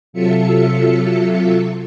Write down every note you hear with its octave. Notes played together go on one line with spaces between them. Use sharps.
C3 F#3 F4 A4 E5 C#7